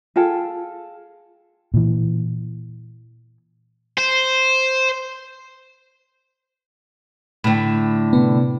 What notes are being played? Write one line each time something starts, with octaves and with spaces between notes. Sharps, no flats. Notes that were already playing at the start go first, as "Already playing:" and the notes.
F4 G#4 A4 G5
A#2 E3
C5
A2 D3 B5
C3 B3